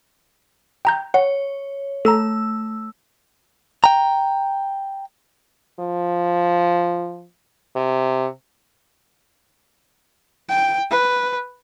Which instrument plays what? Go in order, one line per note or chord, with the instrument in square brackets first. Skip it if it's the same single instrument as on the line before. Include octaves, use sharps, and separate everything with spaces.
[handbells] G5 A#5 G6
[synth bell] C#5 [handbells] F#5
[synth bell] A3 E6 [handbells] A4 A#5
[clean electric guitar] G5 A#5
[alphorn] F3
C3
[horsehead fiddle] G5
B4